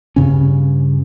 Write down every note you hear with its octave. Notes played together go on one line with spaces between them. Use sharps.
G2 C#3 C#4